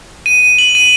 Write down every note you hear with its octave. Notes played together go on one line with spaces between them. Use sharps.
D#7
F#7
D#7